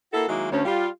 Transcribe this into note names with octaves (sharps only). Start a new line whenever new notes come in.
A#3 E4 F#4 A4
D#3 F#3 G#3 A#3 D#4 E4
D2 C#4
G3 F4